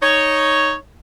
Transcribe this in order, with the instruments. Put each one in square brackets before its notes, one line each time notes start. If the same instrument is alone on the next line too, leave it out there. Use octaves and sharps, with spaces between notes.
[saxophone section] D#4 C#5